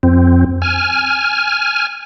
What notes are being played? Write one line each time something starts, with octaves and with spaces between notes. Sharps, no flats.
F2 C4
G#5 F6